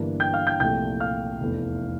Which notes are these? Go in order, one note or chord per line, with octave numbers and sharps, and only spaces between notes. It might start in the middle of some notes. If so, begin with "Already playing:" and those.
Already playing: G1 G2 E3 A#3 D4
G5 G6
F5 F6
G5 G6
C2 A#2 F3 A3 G5 G6
F5 F6
F1 E2 E3 A3